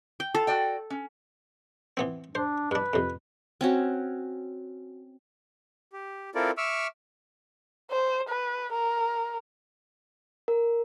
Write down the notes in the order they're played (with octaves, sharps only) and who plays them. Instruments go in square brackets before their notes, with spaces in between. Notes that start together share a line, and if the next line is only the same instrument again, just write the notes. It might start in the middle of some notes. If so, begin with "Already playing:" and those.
[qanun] G5
[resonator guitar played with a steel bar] F4 [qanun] A4
[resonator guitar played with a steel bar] F#4 D5 G5
C#4
[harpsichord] E3 B3 C4
[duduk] D4 [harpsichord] C5
[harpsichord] G2 D4 [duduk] B4
[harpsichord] F2 C3
[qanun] C4 C#4 F#4
[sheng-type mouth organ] G4
C4 E4 F4 A4 A#4 D5
E5 C#6 D6 E6 F6
[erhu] C5
B4
A#4
[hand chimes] A#4